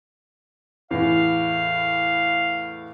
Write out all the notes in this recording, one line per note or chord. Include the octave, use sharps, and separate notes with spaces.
E2 A2 F5